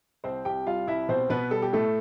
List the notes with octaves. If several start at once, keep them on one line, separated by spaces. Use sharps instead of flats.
C2 C4 C5
C2 G4 G5
G3 F4 F5
C2 E4 E5
B2 C4 C5
B2 B3 B4
G3 A4
G4
A2 A3 A4